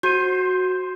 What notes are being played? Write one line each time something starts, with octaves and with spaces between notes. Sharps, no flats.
F#4 C5 G6 D#7